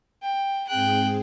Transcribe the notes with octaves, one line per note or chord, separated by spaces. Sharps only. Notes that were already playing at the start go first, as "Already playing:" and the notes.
G5
G#2 C4 G#4 G5 F#6